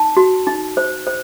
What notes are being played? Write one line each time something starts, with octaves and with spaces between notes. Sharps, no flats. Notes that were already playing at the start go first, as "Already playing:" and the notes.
Already playing: D#4 A5
F#4
D#4
C5
C5